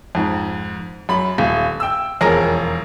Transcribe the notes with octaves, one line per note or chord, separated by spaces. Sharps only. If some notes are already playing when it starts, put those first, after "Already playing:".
F2 G#2
F#2 B5
D#1
G5 E6
E1 F2 G#4 A#4 C#5 A#6